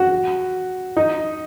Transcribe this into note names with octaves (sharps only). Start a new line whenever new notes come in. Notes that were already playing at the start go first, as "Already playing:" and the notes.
Already playing: F#4
D#4